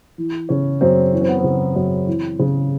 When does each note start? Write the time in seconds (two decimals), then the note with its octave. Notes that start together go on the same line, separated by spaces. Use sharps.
0.18 E3
0.49 C#3 C#4
0.81 F#2 C4
1.13 E3 C#4
1.21 C4
1.29 B3
1.37 C4
1.44 C#3
1.76 F#2
2.07 E3
2.39 C#3